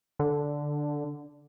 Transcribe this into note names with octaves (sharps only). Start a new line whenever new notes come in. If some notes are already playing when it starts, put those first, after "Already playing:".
D3